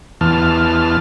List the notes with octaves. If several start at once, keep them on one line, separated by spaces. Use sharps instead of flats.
E2 E3 A5 F6